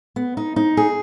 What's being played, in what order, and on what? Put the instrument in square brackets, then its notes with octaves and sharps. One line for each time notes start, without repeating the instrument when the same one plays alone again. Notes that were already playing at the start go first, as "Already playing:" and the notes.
[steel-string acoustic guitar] B3
D#4
D#4
G#4